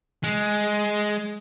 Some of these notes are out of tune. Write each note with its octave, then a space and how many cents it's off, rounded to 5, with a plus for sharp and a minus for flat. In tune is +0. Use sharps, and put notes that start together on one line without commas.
G#3 +5